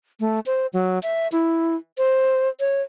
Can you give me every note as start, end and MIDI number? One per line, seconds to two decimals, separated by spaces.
0.20 0.40 57
0.46 0.67 72
0.73 0.99 54
1.03 1.28 76
1.32 1.75 64
1.98 2.49 72
2.60 2.82 73